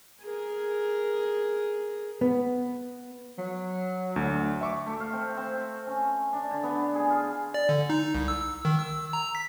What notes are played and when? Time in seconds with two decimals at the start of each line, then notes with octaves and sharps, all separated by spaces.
0.22 G#4 A#4
2.21 B3
3.38 F#3
4.16 D2
4.61 E5 C#6 D6
4.86 A3
5.00 F5
5.13 C4
5.37 C4
5.87 C#4
6.33 D4
6.51 D3
6.63 B3
6.95 G#4
7.10 F4
7.54 D5
7.69 D3
7.90 D#4
8.15 C2
8.28 E6
8.41 E6
8.65 D#3
8.79 E6
9.13 A#5
9.35 B6